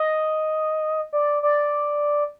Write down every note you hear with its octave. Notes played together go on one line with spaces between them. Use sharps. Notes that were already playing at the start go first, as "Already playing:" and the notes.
Already playing: D#5
D5
D5